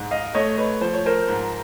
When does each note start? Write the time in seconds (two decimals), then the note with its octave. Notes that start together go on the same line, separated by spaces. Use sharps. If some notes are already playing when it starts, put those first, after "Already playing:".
Already playing: G#2
0.11 D#5 F5
0.34 A3 C#5 D#5
0.58 B4 C#5
0.81 F3 C5
0.94 C#5
1.06 A#4 C5
1.28 G#2